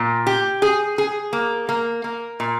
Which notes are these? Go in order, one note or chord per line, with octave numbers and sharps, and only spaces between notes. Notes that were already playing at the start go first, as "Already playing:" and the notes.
Already playing: A#2
G4
G#4
G#4
A#3
A#3
A#3
A#2